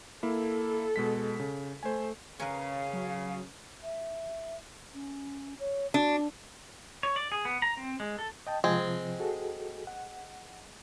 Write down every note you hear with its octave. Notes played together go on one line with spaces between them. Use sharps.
A#3 E4 A4
B2 G#3 B6
C#3
A3 C5 G#5
C#3 C#4 A#4 B4 F5
F#3
E5
C#4
C#5
D4 F#4
C#5
D5
G#4
B3
A#5
C4
G#3
A4
D#5 G5 A5
C3 F3 G#3 C4
F#4 G#4 A4
F#5